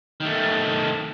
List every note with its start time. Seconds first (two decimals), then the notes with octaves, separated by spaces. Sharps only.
0.20 D#3 A3